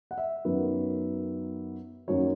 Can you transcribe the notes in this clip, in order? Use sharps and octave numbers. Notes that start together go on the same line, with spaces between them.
F#5
E5
F#2 D#3 F#3 B3
F#2 D#3 F#3 A#3 C#5